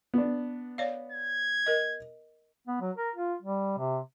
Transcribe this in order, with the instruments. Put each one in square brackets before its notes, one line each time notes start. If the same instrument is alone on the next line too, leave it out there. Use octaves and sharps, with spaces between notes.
[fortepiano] B3 D4
[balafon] C#5 D5 F5
[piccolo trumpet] G#6
[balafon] A#4 D#5
[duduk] B3
F#3
A#4
F4
G3
C3